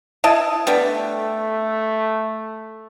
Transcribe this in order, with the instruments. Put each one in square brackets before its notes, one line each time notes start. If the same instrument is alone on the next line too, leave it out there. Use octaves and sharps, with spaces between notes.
[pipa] E4 D#5 A5
[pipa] G3 B3 D4 [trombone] A3